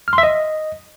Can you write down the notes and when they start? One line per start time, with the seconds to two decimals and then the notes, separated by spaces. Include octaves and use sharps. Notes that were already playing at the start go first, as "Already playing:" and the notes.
0.08 F6
0.13 C6
0.18 E5
0.23 D#5